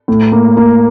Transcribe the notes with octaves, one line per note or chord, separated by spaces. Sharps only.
A2
A#3
A#3